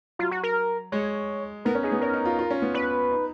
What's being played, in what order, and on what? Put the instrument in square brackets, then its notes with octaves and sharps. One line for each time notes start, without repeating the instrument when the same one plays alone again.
[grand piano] F#3 [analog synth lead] F4
[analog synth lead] F#4
A#4
[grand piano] G#3 [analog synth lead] C#5
[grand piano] B3 [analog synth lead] A#4
[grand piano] C#4
[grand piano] D#4 [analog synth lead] G#4
[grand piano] B3
[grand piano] C#4 [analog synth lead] A#4
[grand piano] D#4
F4
F4
C#4
B3
[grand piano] C#4 [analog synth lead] B4
[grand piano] D#4